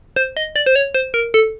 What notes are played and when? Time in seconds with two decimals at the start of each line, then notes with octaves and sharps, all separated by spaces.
0.16 C5
0.37 D#5
0.56 D5
0.66 C5
0.76 C#5
0.94 C5
1.14 A#4
1.34 A4